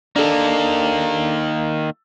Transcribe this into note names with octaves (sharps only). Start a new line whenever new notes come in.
D#3 A#3 D4 A4